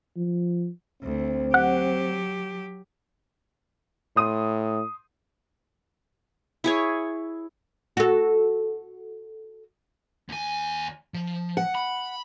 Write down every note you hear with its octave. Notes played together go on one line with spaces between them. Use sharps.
F3
D2 C4
F#3 G4 F#5
A2 C6 D#6 D#7
E4 G#4 C#5
F#4 A4
D#2 G#5
F3
F#5
B5